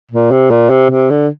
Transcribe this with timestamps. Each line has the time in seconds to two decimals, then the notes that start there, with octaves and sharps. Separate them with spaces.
0.11 A#2
0.31 C3
0.50 A#2
0.70 C3
0.90 C3
1.10 D3